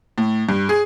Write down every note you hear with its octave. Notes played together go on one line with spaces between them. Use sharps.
A2
G2
G#4